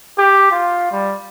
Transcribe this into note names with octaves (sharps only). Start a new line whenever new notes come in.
G4
F4
G3